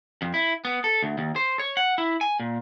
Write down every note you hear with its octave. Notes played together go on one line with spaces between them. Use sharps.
F2
E4
B3
A4
D2
D#2
C5
C#5
F#5
E4
G#5
A#2